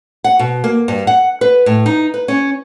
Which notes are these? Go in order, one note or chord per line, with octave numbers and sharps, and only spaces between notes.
F#5
B2
A#3
G2
F#5
B4
A2
D#4
B4
C#4